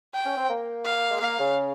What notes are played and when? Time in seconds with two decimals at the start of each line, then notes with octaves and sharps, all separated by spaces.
0.14 G5
0.26 C#4
0.37 C4
0.49 A#3
0.85 F5
1.11 G#3
1.21 A#3 F5
1.39 C#3